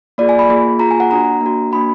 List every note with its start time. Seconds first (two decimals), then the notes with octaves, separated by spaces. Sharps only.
0.18 A#3 F4 G#4 D5
0.29 G#5
0.39 B5
0.49 A#3 F4 G#4
0.79 A#3 F4 G#4 A#5
0.91 G#5
1.00 F#5
1.11 A#3 D4 F#4 A#5
1.41 A#3 D4 F#4
1.72 A#3 D4 F#4 B5